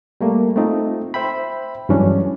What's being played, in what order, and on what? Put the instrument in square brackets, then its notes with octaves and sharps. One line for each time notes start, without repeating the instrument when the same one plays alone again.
[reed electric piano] G3 A3 A#3
A3 C4 D#4 F4
C5 E5 G5 B5
G2 E3 F#3 G#3 C#4 D4